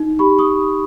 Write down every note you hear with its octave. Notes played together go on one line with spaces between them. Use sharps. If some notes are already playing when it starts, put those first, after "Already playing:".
Already playing: D#4
G4 B5 C#6
C#6 D#6